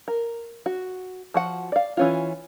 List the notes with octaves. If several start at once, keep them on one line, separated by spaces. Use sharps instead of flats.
A#4
F#4
F3 F#4 F#5
D5 F5
E3 C#4 F4